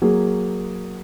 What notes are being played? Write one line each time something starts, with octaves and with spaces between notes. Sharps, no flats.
F#3 A#3 G#4